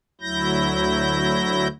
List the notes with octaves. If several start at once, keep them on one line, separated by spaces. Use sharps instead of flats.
D2 F#3 E4 G6 A#6